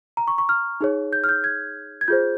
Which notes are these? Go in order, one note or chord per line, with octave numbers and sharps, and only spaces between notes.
A#5
C#6
C#6
F6
D#4 G#4 C#5
G6
F6
G6
G#6
G#6
F4 G#4 C5 G6